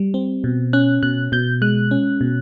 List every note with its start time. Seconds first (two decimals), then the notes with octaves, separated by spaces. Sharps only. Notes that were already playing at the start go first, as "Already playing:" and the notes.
Already playing: G3
0.14 C4
0.44 B2
0.73 C#4 F#6
1.03 B2 F#6
1.32 B2 G6
1.62 G#3 F#6
1.91 C#4
2.21 B2